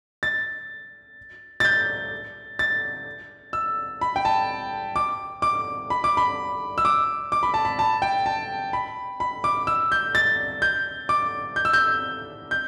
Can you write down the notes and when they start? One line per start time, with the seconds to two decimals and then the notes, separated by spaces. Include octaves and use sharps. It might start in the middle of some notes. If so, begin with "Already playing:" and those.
0.23 A6
1.60 A6
1.65 G6
2.59 A6
3.53 E6
4.01 B5
4.16 G5
4.25 A5
4.96 D6
5.42 D6
5.90 B5
6.04 D6
6.17 B5
6.78 E6
6.85 D6
7.32 D6
7.43 B5
7.54 A5
7.65 B5
7.79 A5
8.02 G5
8.26 A5
8.73 B5
9.20 B5
9.44 D6
9.67 E6
9.92 G6
10.15 A6
10.62 G6
11.09 D6
11.56 G6
11.65 E6
11.73 G6
12.51 G6